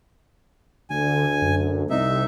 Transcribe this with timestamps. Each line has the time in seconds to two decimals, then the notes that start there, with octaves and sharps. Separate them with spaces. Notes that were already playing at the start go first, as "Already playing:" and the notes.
0.90 D2 D3 G#5
1.42 F#2
1.90 C2 C3 D#4 E5